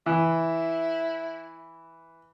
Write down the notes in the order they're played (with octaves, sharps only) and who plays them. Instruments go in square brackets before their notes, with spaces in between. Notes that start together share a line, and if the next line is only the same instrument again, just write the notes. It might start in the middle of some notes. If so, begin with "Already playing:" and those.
[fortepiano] E3 [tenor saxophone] E4